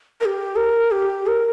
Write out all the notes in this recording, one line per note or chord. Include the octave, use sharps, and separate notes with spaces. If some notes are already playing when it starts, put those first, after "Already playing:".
A#4
G4
A#4
G4
A#4